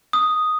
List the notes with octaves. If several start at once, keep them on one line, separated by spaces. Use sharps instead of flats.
D#6